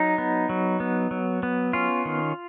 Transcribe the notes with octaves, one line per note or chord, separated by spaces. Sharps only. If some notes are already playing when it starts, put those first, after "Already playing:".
Already playing: F#3 D#4
B3
F#3
B3
F#3
B3
C#4 F4
D#3